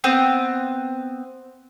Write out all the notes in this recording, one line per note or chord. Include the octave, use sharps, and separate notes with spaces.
B3 C4 G6